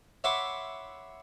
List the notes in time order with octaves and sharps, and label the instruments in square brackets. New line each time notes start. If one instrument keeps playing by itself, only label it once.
[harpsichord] C#5 E5 F#5 B5 C6 D6